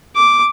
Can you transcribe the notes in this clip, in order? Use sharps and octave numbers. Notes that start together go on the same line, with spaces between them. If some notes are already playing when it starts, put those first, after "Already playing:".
D6